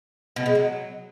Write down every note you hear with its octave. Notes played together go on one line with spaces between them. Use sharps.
B2
G#3
F#3